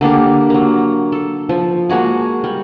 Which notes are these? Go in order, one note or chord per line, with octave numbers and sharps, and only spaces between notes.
D3 A#3 D4 G4
F#3 A#3
A4
F3
G#3 A#3 F#4 G#4
G3